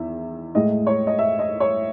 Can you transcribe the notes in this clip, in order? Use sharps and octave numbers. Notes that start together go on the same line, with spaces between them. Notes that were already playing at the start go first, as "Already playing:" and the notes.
Already playing: E2 D#3 E5
A2 G#3 D#5
C#5
D#5
E5
D#5
C#5